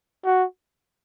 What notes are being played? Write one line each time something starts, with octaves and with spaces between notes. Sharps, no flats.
F#4